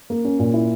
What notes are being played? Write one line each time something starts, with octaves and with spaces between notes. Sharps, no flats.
A#3
C#4
A#2
E4